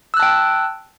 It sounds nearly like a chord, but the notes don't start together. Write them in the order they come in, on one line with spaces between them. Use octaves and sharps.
E6 F#6 A5 G5